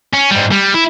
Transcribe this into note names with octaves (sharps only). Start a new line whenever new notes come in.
C#4
G#2 G3
G3
E4